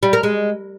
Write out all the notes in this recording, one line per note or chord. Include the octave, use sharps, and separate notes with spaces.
G3
A#4
G#3